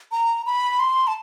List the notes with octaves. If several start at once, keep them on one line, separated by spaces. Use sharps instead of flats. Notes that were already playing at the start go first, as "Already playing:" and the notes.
A#5
B5
C6
A5